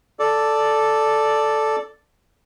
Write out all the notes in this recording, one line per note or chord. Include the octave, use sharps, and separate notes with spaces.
A4 D5